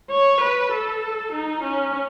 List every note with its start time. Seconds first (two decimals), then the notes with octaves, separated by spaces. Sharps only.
0.11 C#5
0.41 B4
0.72 A4
1.33 D#4
1.63 C#4